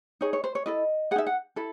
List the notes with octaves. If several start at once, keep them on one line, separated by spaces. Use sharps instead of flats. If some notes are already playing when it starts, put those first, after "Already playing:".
D#4 G#4 C#5
C#5
C5
C#5
E4 A4 D#5
D#4 G#4 E5 F#5
F#5
E4 A4